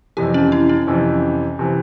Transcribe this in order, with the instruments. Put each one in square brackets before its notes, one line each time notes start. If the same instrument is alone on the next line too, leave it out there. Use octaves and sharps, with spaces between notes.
[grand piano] F2 C3 E3 [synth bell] G4
[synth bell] C#4
E4
C#4
[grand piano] F2 C3 E3
C3 E3